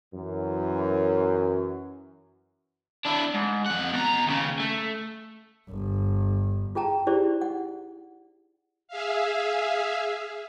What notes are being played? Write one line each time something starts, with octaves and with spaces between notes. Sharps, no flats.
F#2 E3
D4 E4
G#2
F2 F#5
B2 A#5
D#2 C#3
A3
G1
F4 G#4 G5 A5 A#5
D#4 E4 G4 G#4 C5 D5
F#5
G#4 E5 F5